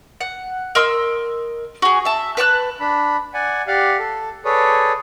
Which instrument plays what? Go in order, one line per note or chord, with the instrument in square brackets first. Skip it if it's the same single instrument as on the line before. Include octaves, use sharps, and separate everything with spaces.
[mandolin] F#5
A#4 D#5 C6 E6
F#4 G#4
E5 A5
B4 A5 C#6 F#6
[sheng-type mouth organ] D4 B5
D5 F#5 G#5
G4 D5 F5 F#5
A4
G#4 A4 B4 C#5 D5